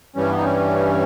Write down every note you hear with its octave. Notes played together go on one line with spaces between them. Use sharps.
G2 E3 G3 C#4
B3
D#4
C#4